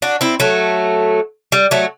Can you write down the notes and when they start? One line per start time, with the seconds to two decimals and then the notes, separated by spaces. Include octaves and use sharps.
0.02 D4 F#4
0.21 C4 E4
0.40 F#3 A3
1.52 G3
1.71 F#3 A3